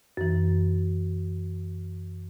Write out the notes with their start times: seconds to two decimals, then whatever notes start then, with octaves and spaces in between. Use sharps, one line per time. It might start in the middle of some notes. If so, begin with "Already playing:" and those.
0.17 F#2 E3